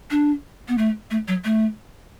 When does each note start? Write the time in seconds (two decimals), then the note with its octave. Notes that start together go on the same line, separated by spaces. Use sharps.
0.11 D4
0.68 B3
0.78 A3
1.11 A3
1.28 F#3
1.45 A3